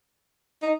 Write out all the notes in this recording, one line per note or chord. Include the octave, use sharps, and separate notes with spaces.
D#4